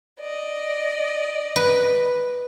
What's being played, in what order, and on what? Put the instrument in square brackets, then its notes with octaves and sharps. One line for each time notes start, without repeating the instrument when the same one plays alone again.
[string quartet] D5 D#5
[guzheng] B4